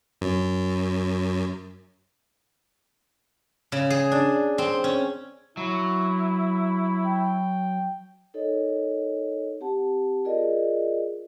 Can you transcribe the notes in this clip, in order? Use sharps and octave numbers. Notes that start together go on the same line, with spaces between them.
F#2
C#3
G#4
D4
C4
C#4
F#3 E4
G5
D#4 A4 A#4 C#5 D#5
C4 G4 F#5 A5
F4 G#4 A#4 D5 D#5